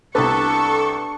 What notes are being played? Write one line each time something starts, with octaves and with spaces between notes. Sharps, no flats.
C2 B3 D4 A4 C#6